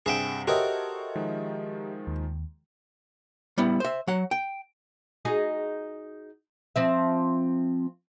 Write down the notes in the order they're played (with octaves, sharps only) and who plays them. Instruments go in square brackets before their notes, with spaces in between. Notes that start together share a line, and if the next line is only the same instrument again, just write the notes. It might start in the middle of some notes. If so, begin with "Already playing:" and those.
[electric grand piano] G2 C3 F#5 [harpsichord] G#4 E5 G5
[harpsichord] F#4 A#4 [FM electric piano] G4 D#5 E5 [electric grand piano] A4 C5 C#5
[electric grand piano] D#3 F3 G#3
[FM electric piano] D#2
[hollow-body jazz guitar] G3 B3 E4
C5 E5
F#3 F#5
G5
[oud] D#4 F#4 G#4
F3 C4 E5